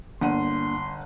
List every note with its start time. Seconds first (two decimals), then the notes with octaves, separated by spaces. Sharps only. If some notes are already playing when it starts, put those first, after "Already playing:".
0.21 G1 A#3 D4 F#5 C6 D#7